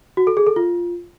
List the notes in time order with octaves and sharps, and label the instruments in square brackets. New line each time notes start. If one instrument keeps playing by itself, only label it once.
[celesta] F#4
A4
G#4
A4
F4